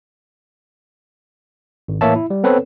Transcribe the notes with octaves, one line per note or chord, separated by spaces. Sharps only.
G#1
A2 E3 A#3 C#5 E5 A5
E4
G3
B3 C4 A4 B4 C#5